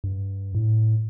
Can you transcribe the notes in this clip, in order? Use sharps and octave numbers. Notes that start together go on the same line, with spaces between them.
G2
A2